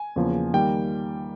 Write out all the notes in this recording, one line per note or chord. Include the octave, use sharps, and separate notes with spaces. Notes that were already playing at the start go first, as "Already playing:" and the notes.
Already playing: G#5
E2 C#3 F3 A#3
D#3 G3 A#3 G5